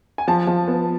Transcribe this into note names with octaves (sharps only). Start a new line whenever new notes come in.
G#5
F3 A5
F3
B3